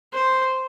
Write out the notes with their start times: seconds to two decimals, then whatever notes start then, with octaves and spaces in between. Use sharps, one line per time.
0.13 C5